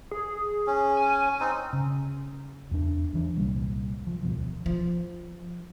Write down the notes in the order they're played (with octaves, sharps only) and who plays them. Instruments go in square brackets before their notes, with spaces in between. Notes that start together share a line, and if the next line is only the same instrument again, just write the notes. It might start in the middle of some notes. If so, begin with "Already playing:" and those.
[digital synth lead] G#4
[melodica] C#4
[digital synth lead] G#5
[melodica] C4 D#4
[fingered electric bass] C#3
E2 D4
E2 E3 D4
C2 A#2 G3
F3
D2 B2 F3
[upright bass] F3